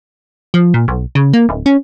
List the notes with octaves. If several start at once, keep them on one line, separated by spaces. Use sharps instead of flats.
F3
A#2
B1
C#3
A#3
D1
C#4